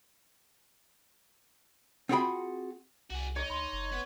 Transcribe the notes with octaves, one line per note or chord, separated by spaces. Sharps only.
C4 F4 F#4 G#4 G5 B5
C2 F#4 G#4
D#4 C#5
D2 B5 C6
F#1
B3 B4